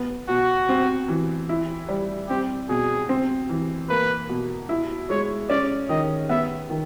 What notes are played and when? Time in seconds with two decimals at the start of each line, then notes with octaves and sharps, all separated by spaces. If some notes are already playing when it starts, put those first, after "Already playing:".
Already playing: B3
0.29 B2 F#4
0.69 C4
1.08 E3
1.49 E4
1.89 G3
2.29 C4 G4
2.69 B2 G#4
3.09 C4
3.49 E3
3.90 A#3 B4
4.29 B2
4.69 E4
5.10 G#3 C#5
5.50 C#4 D5
5.89 D#3 D#5
6.29 B3 E5
6.70 D#3